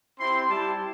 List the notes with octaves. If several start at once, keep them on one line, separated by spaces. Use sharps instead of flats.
C4 E4 G4 C6
G3 E4 G4 A5